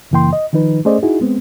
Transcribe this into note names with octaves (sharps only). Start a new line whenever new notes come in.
F#2 C#3 E3 A#3 G5 C6
D#5
D#3 F3 D#4 B4
A3 C#4 G#4 C5 D5 D#5
D#4 E4 F#4 G#4
G#3 B3 C4